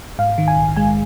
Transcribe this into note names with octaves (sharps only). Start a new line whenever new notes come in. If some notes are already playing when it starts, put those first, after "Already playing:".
G#2 F5
D#3
G#5
A#1
G#3 G#5